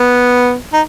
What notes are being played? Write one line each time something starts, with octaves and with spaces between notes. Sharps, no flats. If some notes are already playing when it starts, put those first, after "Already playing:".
Already playing: B3
D#4